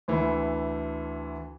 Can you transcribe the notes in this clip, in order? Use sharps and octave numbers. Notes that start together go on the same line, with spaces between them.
D2 D3 E3